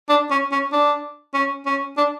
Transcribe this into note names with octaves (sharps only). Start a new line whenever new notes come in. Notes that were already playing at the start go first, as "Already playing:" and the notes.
D4
C#4
C#4
D4
C#4
C#4
D4